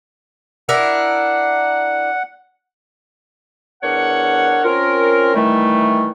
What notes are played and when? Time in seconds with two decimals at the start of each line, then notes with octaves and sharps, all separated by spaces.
0.69 D4 E4 A#4 F#5
3.83 E2 D4 A#4 C#5 F#5
4.64 C4 C#4 F4 A#4
5.35 D#3 E3 G3 A3